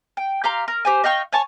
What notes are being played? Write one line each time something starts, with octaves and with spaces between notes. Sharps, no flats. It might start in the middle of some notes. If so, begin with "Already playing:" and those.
G5
G4 F5 A#5 C6
A#4
G4 C5 G#5
D#5 F5 G5 C#6
C#5 G#5 A5 C#6